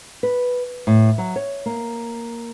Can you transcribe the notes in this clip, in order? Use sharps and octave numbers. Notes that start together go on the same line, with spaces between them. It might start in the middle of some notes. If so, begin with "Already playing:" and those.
B4
A2
F#3
C#5
A#3